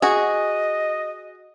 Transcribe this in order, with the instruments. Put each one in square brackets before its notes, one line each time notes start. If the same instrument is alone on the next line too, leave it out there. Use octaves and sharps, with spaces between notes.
[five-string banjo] F#4 G#4 [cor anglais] D#5